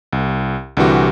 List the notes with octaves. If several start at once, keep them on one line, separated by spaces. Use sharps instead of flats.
C2
C2 D3 E3 F#4 G4